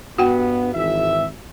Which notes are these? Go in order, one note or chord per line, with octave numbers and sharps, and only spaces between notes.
G2 B3 F#4 F#5 G5
G#1 E3 E5